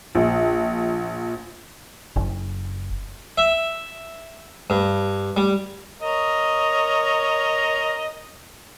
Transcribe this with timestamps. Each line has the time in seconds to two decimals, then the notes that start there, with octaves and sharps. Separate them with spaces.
0.15 A#1
2.16 F#1
3.38 E5
4.70 G2
5.37 G3
6.01 A#4 C#5 D#5